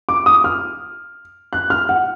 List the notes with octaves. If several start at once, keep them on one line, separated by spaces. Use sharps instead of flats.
D6
D#6
F6
F#6
F6
F#5